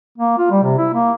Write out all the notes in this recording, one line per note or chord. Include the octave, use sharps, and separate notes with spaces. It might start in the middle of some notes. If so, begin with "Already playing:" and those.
A#3
F4
G3
C3
E4
A#3